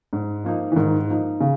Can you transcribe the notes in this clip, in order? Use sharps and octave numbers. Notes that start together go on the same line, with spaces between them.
G#2
F3 A#3 D#4
E3
G#2 D#3
F3 A#3 D#4
C#3